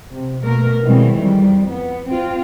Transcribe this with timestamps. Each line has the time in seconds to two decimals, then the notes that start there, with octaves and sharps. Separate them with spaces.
0.11 C3
0.44 B2 A3 A#3 A#4
0.84 B2 D#3 E3 G3 G#3 C4
1.18 F2 G3
1.71 B3
2.10 C4 F4